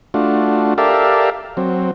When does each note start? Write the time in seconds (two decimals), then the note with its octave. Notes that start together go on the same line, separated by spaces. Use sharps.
0.14 A3 D4 F4 F#4
0.78 G4 A4 A#4 D5 E5 F5
1.57 F#3 C4